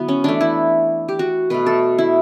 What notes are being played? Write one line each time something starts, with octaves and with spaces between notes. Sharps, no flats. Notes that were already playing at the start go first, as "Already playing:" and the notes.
Already playing: D3 F#3 B3 E4
C#4
E3 A3 D4
E4
G4
F#4
B2 A3 B4
A4
E4